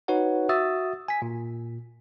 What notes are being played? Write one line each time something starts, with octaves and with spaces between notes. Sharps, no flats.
D#4 F#4 B4 C#5 F#5
F#4 E5 D#6 E6 A6
G#5 B6
A#2